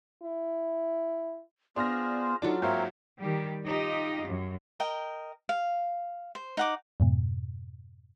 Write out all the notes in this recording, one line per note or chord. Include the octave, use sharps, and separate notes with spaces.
E4
B3 D4 F4 G#4 C5 F6 A#6
F#3 D4 D#4 F4 A4 D6
G#2 A#3 C4 A#4 C5 C#5 E5
D#3 G3 G4
D#4 F4 G4 D#5
F#2
A#4 D#5 G5
F5
C5
D#4 F#5 D6
F2 G#2 B2